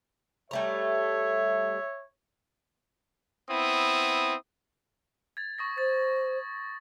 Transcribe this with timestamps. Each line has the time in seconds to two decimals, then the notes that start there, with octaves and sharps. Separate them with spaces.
0.51 G3 A3 C#5 E5 A#5
3.50 B3 C4 E4 D#6
5.37 G#6 A6
5.58 C#6 D#6 A#6
5.78 C5 A6